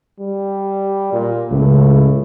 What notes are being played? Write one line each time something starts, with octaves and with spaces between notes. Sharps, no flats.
G3
A#2
C#2 A2